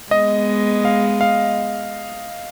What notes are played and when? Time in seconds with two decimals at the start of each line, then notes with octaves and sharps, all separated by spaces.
0.11 G#3 B3 D#5
0.85 F5
1.21 F5